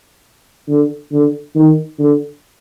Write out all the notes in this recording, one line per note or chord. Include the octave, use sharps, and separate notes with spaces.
D3
D3
D#3
D3